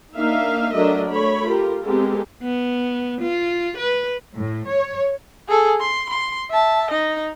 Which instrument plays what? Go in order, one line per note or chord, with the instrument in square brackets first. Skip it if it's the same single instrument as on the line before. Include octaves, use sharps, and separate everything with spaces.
[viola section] A#3 D4 D#4 E5 F5
F#3 A3 D4 A#4 D#5 E5
A3 C#5 B5
F4 G4 A#4
G#3 B3 C4 G4 A4 A#4
[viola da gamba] B3
F4
B4
[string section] A2
C#5
[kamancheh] G#4 A4
C6
C6
E5 A5
D#4 D#5